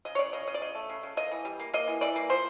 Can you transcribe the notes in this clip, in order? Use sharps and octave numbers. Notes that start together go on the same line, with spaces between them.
C#3 D#5
C#5
C#3 D5
C#3 D#5
C#3 D#5
D5
C#3 D#5
A3
C#3
C#3
A#3 D#5
E3
G3
A#3
A#3 D#5
E3
E3 D5
A#3
F3 C5